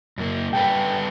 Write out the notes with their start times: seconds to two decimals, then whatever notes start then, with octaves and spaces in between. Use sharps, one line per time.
0.18 F#2 A#3
0.53 G2 A4 B4 G5